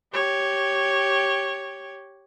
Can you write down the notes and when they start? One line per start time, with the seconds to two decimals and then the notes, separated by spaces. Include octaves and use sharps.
0.13 G4 C#5